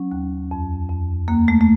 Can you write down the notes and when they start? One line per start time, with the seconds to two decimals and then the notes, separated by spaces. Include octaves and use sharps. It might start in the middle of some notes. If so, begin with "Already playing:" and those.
Already playing: F#3 C#4
0.11 D#2
0.51 F2
0.89 F2
1.28 D#2 A#3
1.48 A3
1.61 A3